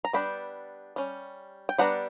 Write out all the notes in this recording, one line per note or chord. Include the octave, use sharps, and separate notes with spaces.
A#5
G3 B3 D4 G5 B5
G3 C#4
G5
G3 B3 D4 F#5 A#5